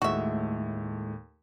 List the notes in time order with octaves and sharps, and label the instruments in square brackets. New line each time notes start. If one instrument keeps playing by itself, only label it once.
[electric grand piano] D#2 A3 [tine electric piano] A2 G#3 [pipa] F#4 E5